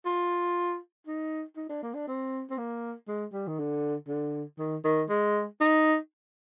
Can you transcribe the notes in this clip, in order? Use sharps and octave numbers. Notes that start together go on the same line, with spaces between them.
F4
D#4
D#4
D4
A#3
D4
C4
C4
A#3
G#3
G3
D#3
D3
D3
D#3
D#3
G#3
D#4